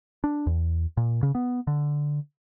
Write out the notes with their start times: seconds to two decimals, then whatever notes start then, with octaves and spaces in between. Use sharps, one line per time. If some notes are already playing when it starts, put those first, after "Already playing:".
0.24 D4
0.47 E2
0.97 A#2
1.23 C#3
1.35 B3
1.67 D3